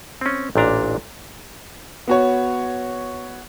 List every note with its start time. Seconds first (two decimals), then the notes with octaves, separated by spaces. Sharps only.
0.21 C4 C#4
0.56 A1 A#2 D4 A#5
2.08 B3 F#4 C#5